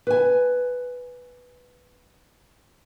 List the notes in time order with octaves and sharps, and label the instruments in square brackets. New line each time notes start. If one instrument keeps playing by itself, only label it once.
[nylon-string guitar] B4 G#5